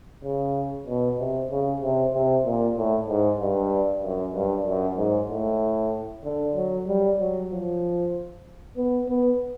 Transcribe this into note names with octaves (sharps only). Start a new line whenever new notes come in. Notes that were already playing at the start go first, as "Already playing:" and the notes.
C#3
B2
C3
C#3
C3
C3
A#2
A2
G#2
G2
F#2
G2
F#2
G#2
A2
D3
F#3
G3
F#3
F3
B3
B3